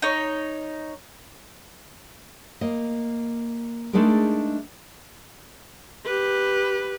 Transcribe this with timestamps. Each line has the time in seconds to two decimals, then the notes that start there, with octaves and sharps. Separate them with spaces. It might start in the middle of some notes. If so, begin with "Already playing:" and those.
0.02 D#4 C#5
2.61 A#3 D#5
3.93 G#3 A3 D4 D#4 G#4 A#4
6.06 G4 B4